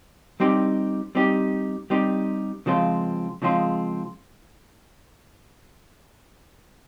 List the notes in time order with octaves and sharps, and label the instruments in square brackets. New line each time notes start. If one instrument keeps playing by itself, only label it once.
[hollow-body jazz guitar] G3 C4 D#4 G4
G3 C4 D#4 G4
G3 C4 D#4 G4
C#3 F3 G#3 C4 F4
C#3 F3 G#3 C4 F4